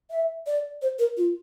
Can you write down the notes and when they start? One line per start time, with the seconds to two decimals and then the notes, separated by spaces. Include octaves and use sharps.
0.10 E5
0.47 D5
0.82 C5
0.99 A#4
1.17 F4